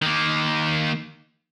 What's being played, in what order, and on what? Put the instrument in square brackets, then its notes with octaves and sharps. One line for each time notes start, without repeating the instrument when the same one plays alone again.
[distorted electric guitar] D#3 A#3